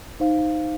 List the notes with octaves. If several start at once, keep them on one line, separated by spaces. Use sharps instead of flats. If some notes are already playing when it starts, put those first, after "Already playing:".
D#4 C5 F5